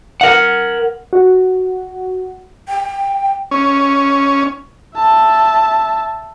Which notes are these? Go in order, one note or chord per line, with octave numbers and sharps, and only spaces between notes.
A#4 F#5
F#4
G5
C#4
E5 A5